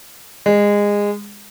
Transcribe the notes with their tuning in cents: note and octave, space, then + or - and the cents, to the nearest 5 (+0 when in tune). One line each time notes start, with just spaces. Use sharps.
G#3 -20